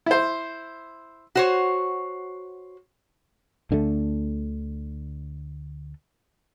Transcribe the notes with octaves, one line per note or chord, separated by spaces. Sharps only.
E4 C5
F#4 C5 C#5
D2 D3 G#3 A3